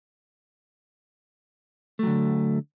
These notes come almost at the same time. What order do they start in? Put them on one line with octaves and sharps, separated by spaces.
A3 F#3 D3